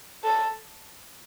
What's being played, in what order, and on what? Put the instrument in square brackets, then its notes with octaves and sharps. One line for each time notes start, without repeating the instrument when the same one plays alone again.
[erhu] A4